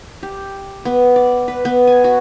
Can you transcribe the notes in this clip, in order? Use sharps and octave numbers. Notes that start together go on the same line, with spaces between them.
G4
B3
D5
B4
B3
G#5
F#4